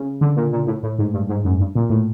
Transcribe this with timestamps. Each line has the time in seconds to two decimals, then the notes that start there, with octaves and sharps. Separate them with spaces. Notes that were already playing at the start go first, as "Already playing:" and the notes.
Already playing: C#3
0.21 D3
0.36 A#2
0.53 A#2
0.67 A2
0.83 A2
0.99 G#2
1.14 G2
1.29 G#2
1.44 F#2
1.60 G2
1.75 A#2
1.90 A2